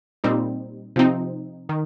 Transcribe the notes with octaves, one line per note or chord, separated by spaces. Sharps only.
A#2 G3 C4 D#4
C3 F3 C4 D#4
D#3